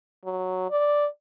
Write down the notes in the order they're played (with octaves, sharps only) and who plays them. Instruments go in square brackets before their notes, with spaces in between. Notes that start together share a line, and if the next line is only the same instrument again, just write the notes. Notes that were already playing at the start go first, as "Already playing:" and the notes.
[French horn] F#3
D5